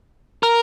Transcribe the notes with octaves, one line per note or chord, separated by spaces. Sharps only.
A#4